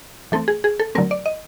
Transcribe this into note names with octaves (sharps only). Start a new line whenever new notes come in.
E3 A3 C4 A4
G#4
G#4
A4
D3 F#3 A3 C4 A#4
D5
D#5